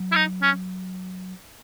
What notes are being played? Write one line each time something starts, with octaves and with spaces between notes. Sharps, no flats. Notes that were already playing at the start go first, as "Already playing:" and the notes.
Already playing: F#3
E4
D#4
C#4